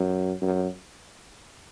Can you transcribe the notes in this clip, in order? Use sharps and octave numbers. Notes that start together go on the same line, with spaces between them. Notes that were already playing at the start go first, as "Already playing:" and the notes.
Already playing: F#2
F#2